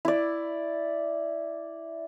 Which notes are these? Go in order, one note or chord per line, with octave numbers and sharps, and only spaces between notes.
E4 D5